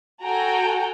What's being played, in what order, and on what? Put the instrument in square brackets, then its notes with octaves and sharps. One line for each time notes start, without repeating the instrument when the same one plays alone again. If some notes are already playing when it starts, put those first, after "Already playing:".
[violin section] F#4 A4 G5 G#5 A#5